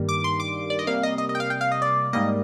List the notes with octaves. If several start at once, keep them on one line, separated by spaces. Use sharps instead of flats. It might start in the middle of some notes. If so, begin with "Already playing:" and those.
Already playing: G2 D#3 G3 A#3
D6
C6
D6
D5
D#5
C3 G3 A#3 F5
D#5
D#5
D#5
G5
F5
G5
F5
D#5
D5
G#2 G3 A#3 D#5